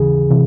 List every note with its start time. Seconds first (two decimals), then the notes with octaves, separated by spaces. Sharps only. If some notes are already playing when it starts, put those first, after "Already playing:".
Already playing: D#2 C#3 E3 G#4
0.31 C3 E3